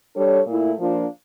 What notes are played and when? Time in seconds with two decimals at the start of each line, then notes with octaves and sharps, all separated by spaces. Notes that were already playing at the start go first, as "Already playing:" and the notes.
0.15 G3 D4 A4 C#5
0.47 A#2 A3 E4
0.79 F3 A#3 D4 F4